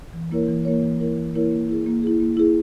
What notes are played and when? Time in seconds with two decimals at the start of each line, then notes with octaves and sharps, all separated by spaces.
0.13 E3
0.32 A#3 E4 A#4 C#5
0.49 E3
0.65 A#3 E4 A#4 C#5
0.82 E3
1.00 A#3 E4 A#4 C#5
1.17 E3
1.34 A#3 E4 A#4 C#5
1.52 A#3
1.69 E4 G#4
1.86 A#3
2.03 E4 G#4
2.20 A#3
2.37 E4 G#4